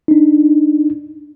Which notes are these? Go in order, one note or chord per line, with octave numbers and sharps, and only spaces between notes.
D4 D#4